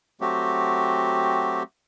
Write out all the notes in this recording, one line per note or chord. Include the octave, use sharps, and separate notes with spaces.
F#3 A3 C4 F#4 G4